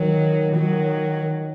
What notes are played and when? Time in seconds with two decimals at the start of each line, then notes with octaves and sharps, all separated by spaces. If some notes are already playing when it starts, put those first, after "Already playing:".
Already playing: D#3 F#3
0.55 D#3 F#3